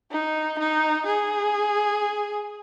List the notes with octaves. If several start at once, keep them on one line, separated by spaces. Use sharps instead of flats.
D#4
D#4
G#4